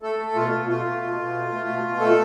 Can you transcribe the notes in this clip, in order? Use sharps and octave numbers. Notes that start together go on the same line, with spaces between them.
A3 A4
A3
B2 F4
B2
A3 F4
A3
B2
B2
A3
A3
B2
B2
A3 A4